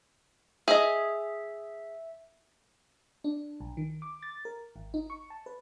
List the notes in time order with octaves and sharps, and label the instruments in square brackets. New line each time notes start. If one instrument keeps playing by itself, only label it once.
[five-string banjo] G#4 D#5 [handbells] E5
[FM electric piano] D4
B1
D#3
D6
A6
A#4
G#1
D#4
C#6
A5
B4